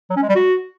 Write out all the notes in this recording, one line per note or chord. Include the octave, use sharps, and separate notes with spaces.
F#3
C#4
G#3
G3
F#4